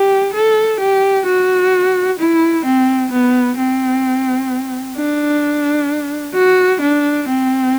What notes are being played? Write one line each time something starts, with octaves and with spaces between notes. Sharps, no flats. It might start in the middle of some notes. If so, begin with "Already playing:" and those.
Already playing: G4
A4
G4
F#4
E4
C4
B3
C4
D4
F#4
D4
C4